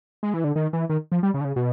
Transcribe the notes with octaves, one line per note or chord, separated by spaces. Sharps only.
G#3
E3
D3
D#3
E3
D#3
F3
G3
C#3
D3
C#3
B2